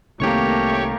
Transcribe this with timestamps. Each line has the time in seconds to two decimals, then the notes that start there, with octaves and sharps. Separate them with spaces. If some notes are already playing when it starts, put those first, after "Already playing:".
0.20 C2 D#3 A3 A#3 C4 G4 C#5 C#6